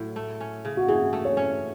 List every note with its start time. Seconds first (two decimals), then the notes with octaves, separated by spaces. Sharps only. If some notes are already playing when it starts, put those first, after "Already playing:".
Already playing: A2 F#3
0.16 A3
0.41 C#4
0.65 C#3
0.77 F#4
0.88 E3 G#4
1.13 A3
1.25 C#5
1.37 C#4